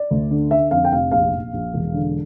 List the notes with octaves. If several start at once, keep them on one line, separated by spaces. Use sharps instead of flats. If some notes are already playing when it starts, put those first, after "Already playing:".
Already playing: D5
D2
D3
D3 E5
F2 F5
G5
F1 F5
A#1 F5
A#1
A#1
E1
D3